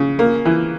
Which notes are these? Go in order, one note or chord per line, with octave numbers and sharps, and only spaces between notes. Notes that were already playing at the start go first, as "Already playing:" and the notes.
Already playing: C#3
A#3
E3